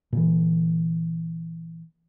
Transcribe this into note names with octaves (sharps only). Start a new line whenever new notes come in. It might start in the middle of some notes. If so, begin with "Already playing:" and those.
A#2 D3 E3